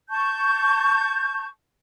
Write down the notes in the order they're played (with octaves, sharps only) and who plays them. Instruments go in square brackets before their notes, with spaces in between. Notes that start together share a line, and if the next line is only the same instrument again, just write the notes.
[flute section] A5 C#6 G6